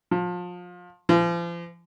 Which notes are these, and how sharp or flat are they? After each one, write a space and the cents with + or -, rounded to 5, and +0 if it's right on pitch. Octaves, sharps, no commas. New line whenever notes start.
F3 +30
F3 -35